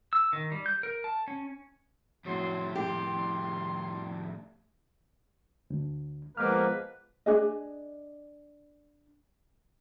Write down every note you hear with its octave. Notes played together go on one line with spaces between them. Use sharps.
E6
D#3
G3
G6
A#4
A5
C#4
F2 A2 F#3 C6
G4 C6
D2
F3 G#3 A#3 B3 B4 D6 F6
D4 G#4 D#5